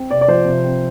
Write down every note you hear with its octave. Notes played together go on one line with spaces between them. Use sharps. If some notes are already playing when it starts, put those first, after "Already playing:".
Already playing: C4
C3 D5
D5
F3 C5
C3
C4